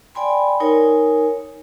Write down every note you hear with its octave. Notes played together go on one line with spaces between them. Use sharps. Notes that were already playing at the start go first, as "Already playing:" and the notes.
D5 G5 G#5 B5 C6
D#4 A#4 C#5 G#5